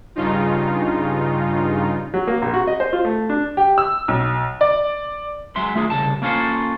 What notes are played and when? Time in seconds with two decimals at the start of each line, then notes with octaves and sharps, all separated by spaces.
0.15 G2 C#3 D#4 F4
2.14 F#3
2.27 A#3
2.42 A#1
2.54 F#4
2.68 D#5
2.80 C5
2.93 F4
3.05 A3
3.29 D4
3.57 G4
3.78 E6
4.08 B1
4.61 D5
5.56 F#3 G#3 E5 C6
5.75 A3 F4 G#4
5.90 C2 C#3 A5
6.22 A#3 C#4 F4 A4 C5